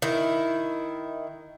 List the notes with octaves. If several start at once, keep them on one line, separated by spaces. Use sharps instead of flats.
D#3 E4